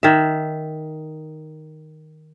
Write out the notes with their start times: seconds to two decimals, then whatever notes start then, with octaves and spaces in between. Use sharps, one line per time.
0.03 D#3 E5